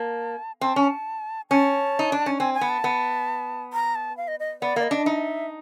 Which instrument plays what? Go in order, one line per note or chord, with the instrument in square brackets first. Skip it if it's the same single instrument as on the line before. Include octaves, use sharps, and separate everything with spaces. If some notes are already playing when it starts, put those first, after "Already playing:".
Already playing: [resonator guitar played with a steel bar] A#3 [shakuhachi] A5
[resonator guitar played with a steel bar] C4 [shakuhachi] A5
[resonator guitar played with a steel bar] C#4
[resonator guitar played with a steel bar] C#4 [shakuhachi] A5
[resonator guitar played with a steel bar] D#4
D4
C#4
[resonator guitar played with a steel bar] C4 [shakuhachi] G#5
[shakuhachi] G#5
[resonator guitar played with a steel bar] B3
[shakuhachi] A5
[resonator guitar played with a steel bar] B3
[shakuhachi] A#5
A5
F5
D#5
D#5
[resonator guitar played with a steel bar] B3 [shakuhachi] D5
[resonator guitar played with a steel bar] A#3 [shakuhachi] D5
[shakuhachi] D#5
[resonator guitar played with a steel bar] D4
[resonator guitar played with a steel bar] D#4 [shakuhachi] E5